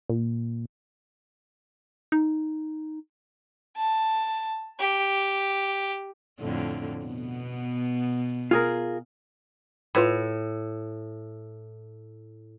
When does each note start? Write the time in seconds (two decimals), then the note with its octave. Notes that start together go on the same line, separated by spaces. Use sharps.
0.09 A#2
2.12 D#4
3.77 A5
4.80 G4
6.40 F2 A2 D3
7.05 B2 B3
8.51 F4 G#4 A#4
9.95 A2 F4 B4 B5